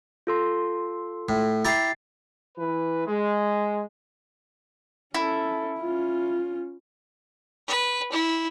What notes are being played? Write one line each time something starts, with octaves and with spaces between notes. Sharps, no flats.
F4 A4 C6
A2
E4 G4 A#5 A6 C7
E3 B4
G#3
C#4 E4 A4
C#4 F4
B4
E4